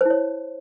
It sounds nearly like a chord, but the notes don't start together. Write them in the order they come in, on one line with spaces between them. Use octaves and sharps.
C5 E4 C#5